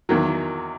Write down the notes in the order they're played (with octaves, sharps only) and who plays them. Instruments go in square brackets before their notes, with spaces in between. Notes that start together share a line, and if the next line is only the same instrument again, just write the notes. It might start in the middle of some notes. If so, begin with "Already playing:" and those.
[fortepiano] E2 D#3 F#3